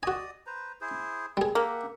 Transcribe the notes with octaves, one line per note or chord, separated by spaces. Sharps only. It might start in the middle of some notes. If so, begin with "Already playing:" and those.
F#4 D5 D#5 G#5 D#6
B4 C5 A#5
E4 G#4 C5
G3 C4 G#4
A#3 G4 E5 F#5